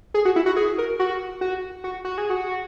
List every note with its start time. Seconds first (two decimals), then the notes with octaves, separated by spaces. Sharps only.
0.14 G#4
0.25 F#4
0.36 E4
0.46 F#4
0.56 G#4
0.78 A#4
0.99 F#4
1.41 F#4
1.84 F#4
2.05 F#4
2.18 G#4
2.30 F#4